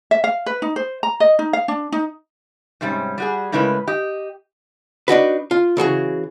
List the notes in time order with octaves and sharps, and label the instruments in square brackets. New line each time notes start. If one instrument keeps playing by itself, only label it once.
[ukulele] E5
F5
B4
D#4
C5
A#5
D#5
D#4
F5
D4
D#4
[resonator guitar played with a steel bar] G#2 C3 G3 C#4
G3 F#4 G#4
A2 C#3 G#3 E4 A#4 B4
G4 D#5
[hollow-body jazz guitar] D4 D#4 F#4 B4
F4
C#3 E3 F#4 G#4